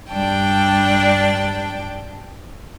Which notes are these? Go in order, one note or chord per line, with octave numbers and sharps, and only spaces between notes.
G2 G3 D4 G5 A5